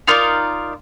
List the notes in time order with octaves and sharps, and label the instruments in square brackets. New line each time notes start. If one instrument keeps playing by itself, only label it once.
[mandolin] D#4 F4 A#4 D5